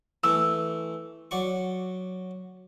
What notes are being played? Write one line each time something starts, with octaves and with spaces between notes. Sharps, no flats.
E3 A3 E6
F#3 D5 C#6